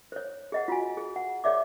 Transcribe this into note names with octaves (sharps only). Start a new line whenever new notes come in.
C5 C#5
G#4 D#5 F#5
F4 F#4 G#5
G#4
F#5
G#4 C#5 D5 E5 D6